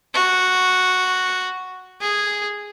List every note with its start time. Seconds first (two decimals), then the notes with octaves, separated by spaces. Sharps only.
0.14 F#4
2.01 G#4